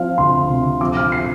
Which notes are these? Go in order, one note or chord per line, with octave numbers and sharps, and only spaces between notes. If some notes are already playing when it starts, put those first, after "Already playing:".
Already playing: F3 C4 F5
D2 C6
C3
F3 D6
F6
C7